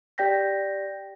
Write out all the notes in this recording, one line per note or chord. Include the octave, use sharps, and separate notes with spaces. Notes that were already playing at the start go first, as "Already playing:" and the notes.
G4 D5 G5 G6 A#6 B6